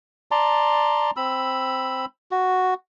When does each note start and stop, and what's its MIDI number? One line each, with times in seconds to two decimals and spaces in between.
0.31 1.11 74
0.31 1.11 81
0.31 1.11 82
0.31 1.11 84
1.17 2.05 60
1.17 2.05 83
1.17 2.05 88
2.31 2.74 66